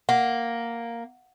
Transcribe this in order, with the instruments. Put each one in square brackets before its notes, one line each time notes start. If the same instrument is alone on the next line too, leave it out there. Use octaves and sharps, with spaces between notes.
[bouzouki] A#3 [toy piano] F#5